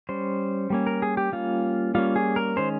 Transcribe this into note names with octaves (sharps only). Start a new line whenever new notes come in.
G3 C#4 C5
G3 A#3 C#4
A#4
G#4
G4
G3 A#3 C#4 F4
G3 A#3 C#4 F4
G#4
A#4
D#3 G#3 C#4 C5